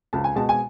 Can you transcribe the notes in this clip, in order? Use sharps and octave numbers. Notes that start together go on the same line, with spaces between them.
C#2 A5
G#5
B2 G#3 A5
G#5